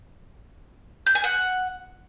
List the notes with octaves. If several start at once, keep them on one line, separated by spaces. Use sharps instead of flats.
G6
G#5
F#5